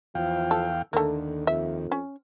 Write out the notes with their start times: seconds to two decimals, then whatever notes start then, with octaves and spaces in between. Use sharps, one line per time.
0.15 E2 F3 F5 G5
0.51 A4
0.93 D#2 D3 A3 A#3
1.47 F2 E5
1.92 C#4